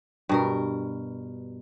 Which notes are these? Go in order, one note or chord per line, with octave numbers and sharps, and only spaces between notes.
G2 B2 A#4